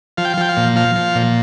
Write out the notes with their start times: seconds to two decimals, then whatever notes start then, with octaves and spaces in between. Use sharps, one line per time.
0.18 F3 F5
0.25 G5
0.34 F5
0.38 F3 G5
0.49 F5
0.57 A#2
0.76 F3 F5
0.95 F3
1.15 A#2